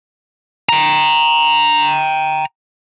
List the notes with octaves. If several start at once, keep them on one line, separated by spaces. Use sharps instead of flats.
G5 A#5